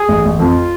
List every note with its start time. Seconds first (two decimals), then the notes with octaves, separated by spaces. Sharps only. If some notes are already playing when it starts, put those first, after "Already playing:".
Already playing: G#4
0.08 A1
0.25 A1
0.39 F2 F4